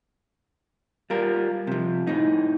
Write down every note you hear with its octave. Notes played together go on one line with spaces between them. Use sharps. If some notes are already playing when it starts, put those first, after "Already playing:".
G3 F4 A#4
C3 F3
A2 D#4